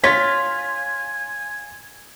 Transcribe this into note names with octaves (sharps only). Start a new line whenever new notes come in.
F4 C#5 G#5 B6